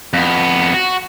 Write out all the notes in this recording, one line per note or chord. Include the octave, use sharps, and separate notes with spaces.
F2 B3
F#4